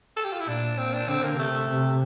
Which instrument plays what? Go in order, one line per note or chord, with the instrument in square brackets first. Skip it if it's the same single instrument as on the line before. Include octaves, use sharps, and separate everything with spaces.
[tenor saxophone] A4
G4
F4
E4
[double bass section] A#2 [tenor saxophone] D4
[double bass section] A#2 [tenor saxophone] C4
[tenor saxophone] D4
[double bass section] D3 [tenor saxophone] C4
[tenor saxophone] A#3
[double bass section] C3 [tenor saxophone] A3
[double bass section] C3